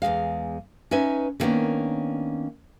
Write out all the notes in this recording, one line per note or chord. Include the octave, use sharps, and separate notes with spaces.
E2 G#2 G#3 F5
C#4 D#4 B4 E5 G#5
D3 D#3 A#3 B3 C#4 D4